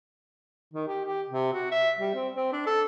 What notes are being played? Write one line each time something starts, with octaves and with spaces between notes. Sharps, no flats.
D#3
G4
G4
C3
F#4
E5
G3
C4
C4
D4
A4